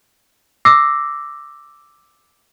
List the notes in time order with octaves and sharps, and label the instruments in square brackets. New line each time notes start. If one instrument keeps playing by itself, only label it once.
[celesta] D6 E6 A#6 C7